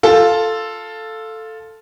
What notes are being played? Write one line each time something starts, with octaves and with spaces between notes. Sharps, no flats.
F4 A4